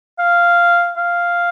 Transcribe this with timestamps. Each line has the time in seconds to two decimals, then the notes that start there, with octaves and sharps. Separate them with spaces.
0.19 F5
0.97 F5